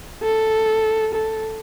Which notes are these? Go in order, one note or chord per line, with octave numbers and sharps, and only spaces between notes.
A4
A4